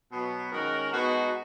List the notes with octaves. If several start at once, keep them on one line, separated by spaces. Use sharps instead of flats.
B2 F#3 B3
D#3 G#3 C#4 F#4 A#4
B2 G#3 B3 D#4 F#4